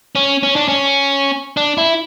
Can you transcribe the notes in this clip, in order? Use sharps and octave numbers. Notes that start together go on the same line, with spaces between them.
C#4
C#4
D4
C#4
D4
E4